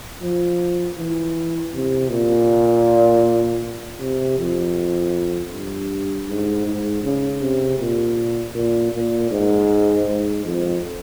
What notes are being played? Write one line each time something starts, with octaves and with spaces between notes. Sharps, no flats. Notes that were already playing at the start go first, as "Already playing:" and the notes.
F3
E3
C3
A#2
C3
F2
G2
G#2
G#2
C#3
C3
A#2
A#2
A#2
G#2
G#2
F2